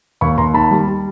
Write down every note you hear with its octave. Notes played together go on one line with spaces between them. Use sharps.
D#2 B5 C#6
D#2 A#5 C6
D#3 A5 B5
G3
G3